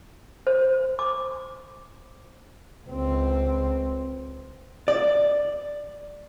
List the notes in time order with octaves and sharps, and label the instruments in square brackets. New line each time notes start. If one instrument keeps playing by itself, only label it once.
[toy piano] C5
D6
[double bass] C#2 C4
[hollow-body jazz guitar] D5